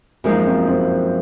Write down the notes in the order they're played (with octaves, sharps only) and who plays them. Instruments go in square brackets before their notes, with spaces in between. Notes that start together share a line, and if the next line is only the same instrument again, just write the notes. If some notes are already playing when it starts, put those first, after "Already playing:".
[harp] F#2 F3 G#3 D#4 [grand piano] A#3
[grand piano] C4
C4